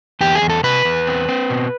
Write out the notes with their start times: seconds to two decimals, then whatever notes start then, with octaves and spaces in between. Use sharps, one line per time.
0.21 E2 G4
0.35 G#4
0.42 E2
0.50 A4
0.63 C3 B4
0.85 E2
1.07 C4
1.29 C4
1.50 B2